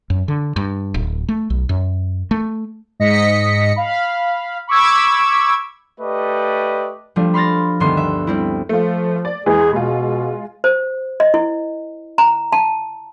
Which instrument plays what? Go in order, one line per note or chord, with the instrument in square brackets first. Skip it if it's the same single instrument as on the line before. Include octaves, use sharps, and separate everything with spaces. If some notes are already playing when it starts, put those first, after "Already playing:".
[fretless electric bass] F#2
D3
G2
D1
A3
B1
F#2
A3
[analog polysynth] G#2 D#5 A#6 B6 C#7
F5 B5
B5 C#6 D6 E6 G#6
[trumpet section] A3 G4 B4 D5 D#5
[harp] F3 G3 A3 D4
B5 C6 F6 A6 A#6
D2 G2 D#3 G3 B3 C6
E5
G3 C4 E4
[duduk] F3 [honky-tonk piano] A3 F4
[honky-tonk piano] D5
[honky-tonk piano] E2 E3 G#3 [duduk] G#4
[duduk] B2 [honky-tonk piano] G#3 F4
[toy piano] C5
D#5
E4
A#5
A5